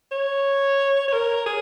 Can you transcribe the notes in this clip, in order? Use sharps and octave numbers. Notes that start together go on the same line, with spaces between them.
C#5
C#5
A#4
G#4